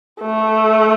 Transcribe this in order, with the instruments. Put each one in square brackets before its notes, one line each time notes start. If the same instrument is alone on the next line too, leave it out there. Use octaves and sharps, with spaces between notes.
[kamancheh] A3